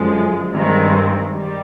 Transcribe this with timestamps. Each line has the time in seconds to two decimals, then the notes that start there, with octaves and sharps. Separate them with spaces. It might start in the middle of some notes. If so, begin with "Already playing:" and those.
Already playing: F#2 D3 F3 G#3
0.54 G2 D#3 G#3 C4
1.31 D#3 G3